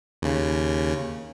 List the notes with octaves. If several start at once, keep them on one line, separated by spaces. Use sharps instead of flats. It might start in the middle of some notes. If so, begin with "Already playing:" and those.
D#2 C#3